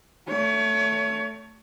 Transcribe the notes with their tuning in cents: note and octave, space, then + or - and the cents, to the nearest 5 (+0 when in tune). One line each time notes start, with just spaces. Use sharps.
A3 +15 C#5 +30